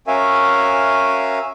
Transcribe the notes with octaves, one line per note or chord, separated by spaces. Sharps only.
C#4 F#4 A#4 E5 F5 G#5